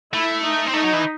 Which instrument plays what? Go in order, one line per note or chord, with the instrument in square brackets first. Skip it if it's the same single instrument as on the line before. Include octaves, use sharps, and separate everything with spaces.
[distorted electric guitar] A3 [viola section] E4
[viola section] D#4
[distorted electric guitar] C4
[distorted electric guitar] A3 [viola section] D#4
[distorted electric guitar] F#3
E3